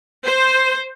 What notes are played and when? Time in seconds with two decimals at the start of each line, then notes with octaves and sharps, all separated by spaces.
0.25 C5